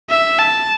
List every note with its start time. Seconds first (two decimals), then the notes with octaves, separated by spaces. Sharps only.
0.10 E5
0.39 A5